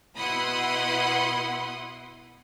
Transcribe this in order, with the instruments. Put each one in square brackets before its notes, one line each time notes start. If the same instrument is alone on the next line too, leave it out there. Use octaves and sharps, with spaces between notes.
[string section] B2 E4 F#5 B5 C6 D#6